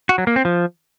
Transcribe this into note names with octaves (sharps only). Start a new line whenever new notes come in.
F#4
F#3
A#3
C4
F3